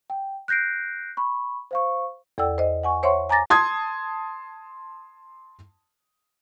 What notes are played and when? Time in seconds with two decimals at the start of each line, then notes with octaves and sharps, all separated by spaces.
0.10 G5
0.48 F#6 G6 A#6 C7 D7
1.17 B5 C#6
1.71 C5 F5 C#6
2.38 E2 A4 D5 F#5 G5 E6
2.58 C5 D#5
2.83 F#5 G#5 C#6
3.03 C5 C#5 E5 F#5 C6 C#6
3.29 G#5 A#5 D6 A6 A#6
3.50 A5 C6 D#6 G#6